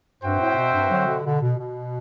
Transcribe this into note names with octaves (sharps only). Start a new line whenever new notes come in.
G2 C4 F#4 C5 E5 G5
A2
B2
G2
D3 F#3
B2 D3
B2 D3
B2
B2